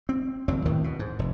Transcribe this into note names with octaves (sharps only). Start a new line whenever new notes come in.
C4
F#1 D#2 F#3 C4
D#2 A2 D#3 E3
B2
G#2
F1